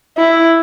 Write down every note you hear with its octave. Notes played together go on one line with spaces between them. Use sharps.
E4